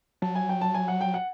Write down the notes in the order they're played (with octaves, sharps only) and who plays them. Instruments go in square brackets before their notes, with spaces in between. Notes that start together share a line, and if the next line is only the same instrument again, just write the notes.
[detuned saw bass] F#3 [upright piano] A5
[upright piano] G#5
G5
A5
G#5
F#5
G5
F#5